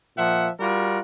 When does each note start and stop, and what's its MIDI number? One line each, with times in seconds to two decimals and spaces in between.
0.17 0.49 46
0.17 0.49 53
0.17 0.49 76
0.17 0.49 78
0.60 1.01 55
0.60 1.01 65
0.60 1.01 66
0.60 1.01 70